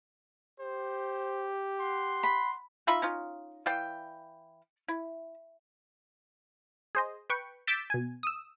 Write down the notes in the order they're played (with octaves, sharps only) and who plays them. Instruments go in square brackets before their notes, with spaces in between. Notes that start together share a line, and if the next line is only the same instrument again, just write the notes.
[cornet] G4 [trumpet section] C5
[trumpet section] F#5 C6
[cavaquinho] B5
[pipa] D#4 F4 E5 B5
C#4 D#4 F4
E3 D5 F5 G5
E4
[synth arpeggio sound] G#4 C5 D#5
B4 G5 C#6
D6 E6 G6 A6 B6 E7
B2 G#5
D#6 E6